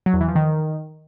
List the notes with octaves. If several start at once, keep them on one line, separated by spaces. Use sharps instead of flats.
F#3
E2
E3
F3
D#3